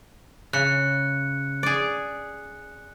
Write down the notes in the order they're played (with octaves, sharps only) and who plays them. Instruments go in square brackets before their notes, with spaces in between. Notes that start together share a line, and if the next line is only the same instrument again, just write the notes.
[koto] C#3 [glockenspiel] F#6 C#7
[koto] G#4 D5